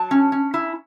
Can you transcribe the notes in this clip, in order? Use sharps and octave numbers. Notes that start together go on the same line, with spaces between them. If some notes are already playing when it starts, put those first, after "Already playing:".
Already playing: F#3 A5
C#4
C#4
E4